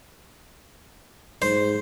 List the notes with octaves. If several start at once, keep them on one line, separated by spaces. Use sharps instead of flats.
G#2 C5